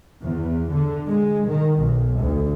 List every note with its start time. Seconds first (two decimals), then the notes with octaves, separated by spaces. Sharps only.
0.21 E2
0.71 D3
1.07 G#3
1.48 D#3
1.78 B1
2.20 D2